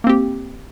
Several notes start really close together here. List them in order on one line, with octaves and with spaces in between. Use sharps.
A#3 C4 G4